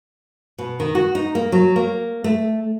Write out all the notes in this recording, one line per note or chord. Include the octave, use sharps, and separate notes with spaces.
B2
D#3
F#4
D#4
A#3
F#3
A#3
A3